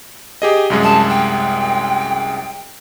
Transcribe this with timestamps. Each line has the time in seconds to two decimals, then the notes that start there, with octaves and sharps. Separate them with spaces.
0.42 G4 G#4 D#5
0.70 C2 F#2 G#3
0.83 A5
1.09 G5